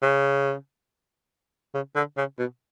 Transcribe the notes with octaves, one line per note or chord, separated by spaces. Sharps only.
C#3
C#3
D3
C#3
B2